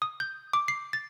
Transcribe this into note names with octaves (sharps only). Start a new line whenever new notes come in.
D#6
G6
D6
C7
A6